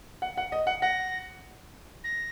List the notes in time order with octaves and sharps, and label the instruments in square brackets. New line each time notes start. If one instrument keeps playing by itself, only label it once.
[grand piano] F#5
F#5
D#5
F#5
[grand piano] F#5 [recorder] A#6
[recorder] A#6